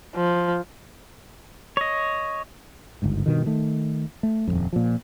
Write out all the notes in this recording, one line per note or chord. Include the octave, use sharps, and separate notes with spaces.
F3
C#5 D#5
G1 C#2 G#2
G2 B2 D#3
D#3 A3
A3
D#1 A#1 F2
A#2 F3